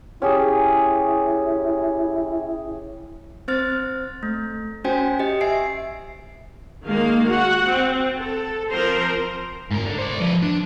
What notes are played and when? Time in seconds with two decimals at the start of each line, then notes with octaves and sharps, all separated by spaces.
0.22 C#4 E4 G4 G#4
3.48 C4 C5 F6 A6
4.23 A3
4.84 C#4 F#4 C5 G5 G#5
5.19 G4 D#5
5.41 E5 G#5 C7 D7
6.85 D#3 G#3 A#3 F5
7.28 F#4 F#5
7.67 C4
8.16 A4
8.70 F3 C4 A#4 C5 A#5 C6
9.71 G#2 A#4
9.86 D3
9.98 C5 D5
10.20 F3 B4
10.42 D4